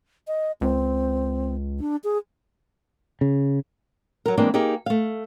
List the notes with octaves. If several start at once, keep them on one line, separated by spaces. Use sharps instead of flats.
D#5
C#2 C4
D4
G#4
C#3
F#3 A#4
E3 G#3 A#3 C4 D4
A#3 D#4 G4 G#4
A3 F5